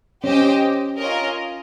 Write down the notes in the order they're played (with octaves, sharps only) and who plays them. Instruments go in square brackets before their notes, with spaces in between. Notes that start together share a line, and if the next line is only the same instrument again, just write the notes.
[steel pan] C#4 [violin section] G4 C5 D#5 G5
[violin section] C#4 F4 A#4 D#5